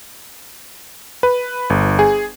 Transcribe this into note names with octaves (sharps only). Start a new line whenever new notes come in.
B4
G1
G#4